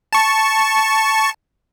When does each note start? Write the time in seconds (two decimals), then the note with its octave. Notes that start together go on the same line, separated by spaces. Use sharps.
0.13 A5 C#6